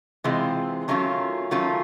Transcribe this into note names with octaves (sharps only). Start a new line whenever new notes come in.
C3 E3 G#3 C4 F4
D#3 F#3 A3 C#4 F4
D#3 F#3 A3 C#4 F4